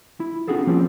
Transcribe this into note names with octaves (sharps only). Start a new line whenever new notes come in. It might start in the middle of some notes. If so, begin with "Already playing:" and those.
E4
C4 D4 F4 F#4 G#4 A4
F3 G3 A#3 C4 C#4 F4